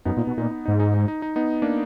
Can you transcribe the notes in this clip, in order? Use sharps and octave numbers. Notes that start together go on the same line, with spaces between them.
F#2 B3 D#4
A#2
B2
A#2 D#4
D#4
D#4
G#2
D#4
D#4
D#4
D#4
B3 D#4
A#3 D4